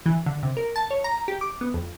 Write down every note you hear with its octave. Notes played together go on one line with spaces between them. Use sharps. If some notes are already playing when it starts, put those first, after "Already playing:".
E3
D3
C3
A#4
A5
C#5
A#5
G4
D6
B3
F2